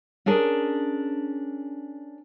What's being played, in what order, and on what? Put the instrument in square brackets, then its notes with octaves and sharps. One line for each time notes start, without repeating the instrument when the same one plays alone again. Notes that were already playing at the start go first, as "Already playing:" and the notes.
[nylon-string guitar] C#4 D4 G#4 A#4